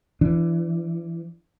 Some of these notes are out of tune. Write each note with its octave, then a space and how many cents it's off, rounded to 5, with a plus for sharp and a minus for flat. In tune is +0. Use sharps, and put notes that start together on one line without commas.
E3 +25 D4 +0